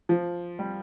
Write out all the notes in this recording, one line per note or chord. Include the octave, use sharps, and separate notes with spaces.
F3
G3